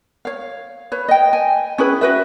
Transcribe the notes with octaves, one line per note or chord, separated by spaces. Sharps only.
C#5 F5
B4 C#5
D#5 G5
G#5
C#4 E4 G#4 B4
F#4 B4 E5